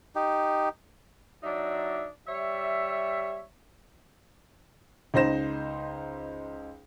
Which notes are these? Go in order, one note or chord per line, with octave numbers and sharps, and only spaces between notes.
D#4 G4
F#3 D4 D#4 D5 E5
G3 C#5 E5
C#2 D#4 C5 A#6 E7